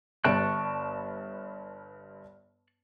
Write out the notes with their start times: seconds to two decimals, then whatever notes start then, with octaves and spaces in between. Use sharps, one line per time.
0.24 G1 G2 A5 C#6 F#6 D7